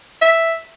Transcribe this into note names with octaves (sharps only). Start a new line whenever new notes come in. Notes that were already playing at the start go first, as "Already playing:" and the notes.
E5